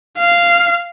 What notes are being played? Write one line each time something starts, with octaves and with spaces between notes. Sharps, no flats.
F5